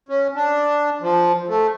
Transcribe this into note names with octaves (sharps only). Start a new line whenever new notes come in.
C#4
D4
F3
A3